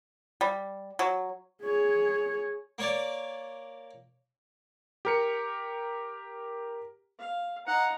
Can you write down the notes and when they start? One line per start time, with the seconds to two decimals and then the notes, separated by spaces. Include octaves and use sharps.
0.41 G3
0.99 F#3
1.62 G#4 C#5
2.78 A#3 C#5 D5
5.05 G4 A#4 C#7
7.19 F5
7.67 D#4 F#5 A#5